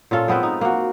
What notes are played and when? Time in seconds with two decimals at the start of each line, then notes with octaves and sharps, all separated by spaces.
0.11 A#2 C#4 F4 A4
0.28 G#3 B3 C4 B4
0.43 D#4
0.61 A#3 F#4